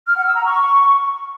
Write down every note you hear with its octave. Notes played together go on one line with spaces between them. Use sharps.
F6
F#5
E6
A#5
C#6